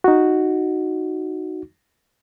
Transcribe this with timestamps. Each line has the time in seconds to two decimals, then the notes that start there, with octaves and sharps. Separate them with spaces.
0.04 D#4 F#4